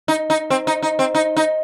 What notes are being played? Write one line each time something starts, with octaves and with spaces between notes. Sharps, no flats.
D#4
D#4
C4
D#4
D#4
C4
D#4
D#4